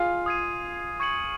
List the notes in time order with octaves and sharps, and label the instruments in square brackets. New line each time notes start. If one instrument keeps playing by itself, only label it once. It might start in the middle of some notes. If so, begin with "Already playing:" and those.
Already playing: [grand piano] F4 G#4 F5
[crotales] D#6 G#6 C7 D#7
C#6 G#6 C#7 F#7